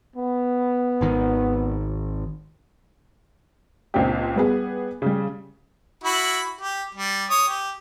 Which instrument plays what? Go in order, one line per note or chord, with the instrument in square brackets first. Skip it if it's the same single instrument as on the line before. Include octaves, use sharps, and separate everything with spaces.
[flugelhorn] B3
[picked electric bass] G#1 D#3
[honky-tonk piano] C#2 A#2 C4 D4 G4
G3 B3 G#4
C#3 G3
[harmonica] E4 F#4 B5
G4
G3
C#5 D#6
G4